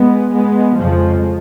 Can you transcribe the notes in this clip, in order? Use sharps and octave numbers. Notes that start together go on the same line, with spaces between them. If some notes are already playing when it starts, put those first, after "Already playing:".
Already playing: G#3 B3
G#3 B3
F2 C#3 F3 G#3